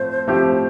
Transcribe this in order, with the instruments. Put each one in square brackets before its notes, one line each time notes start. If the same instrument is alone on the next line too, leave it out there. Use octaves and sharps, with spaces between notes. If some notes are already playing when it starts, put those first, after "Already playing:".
Already playing: [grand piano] A2 F3 C4 [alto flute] C5
[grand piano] A2 F3 C4 G4